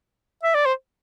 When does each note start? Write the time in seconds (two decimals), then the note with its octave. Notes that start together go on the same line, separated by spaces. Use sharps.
0.43 E5
0.54 D5
0.65 C5